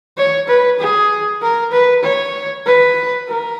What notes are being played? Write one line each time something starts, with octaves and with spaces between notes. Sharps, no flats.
C#5
B4
G#4
A#4
B4
C#5
B4
A#4